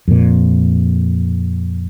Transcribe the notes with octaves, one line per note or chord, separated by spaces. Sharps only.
F2 A#2